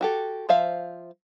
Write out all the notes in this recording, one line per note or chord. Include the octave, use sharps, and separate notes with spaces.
F#4 G4 A4
F3 C5 E5 F5